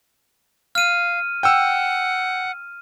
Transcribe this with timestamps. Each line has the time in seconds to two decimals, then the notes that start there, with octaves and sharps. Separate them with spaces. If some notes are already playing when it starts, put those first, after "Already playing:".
0.75 F5 F6 D#7
1.43 F#5 G5 E6